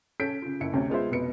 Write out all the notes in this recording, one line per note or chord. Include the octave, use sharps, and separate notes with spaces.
C#4 A4 G6 B6 D7
C#3 F4
F#1 E4 C#7
D2 C3 C#4
G#3 B3 F4 G#4 C5 E5
F1 B2 B4 C#7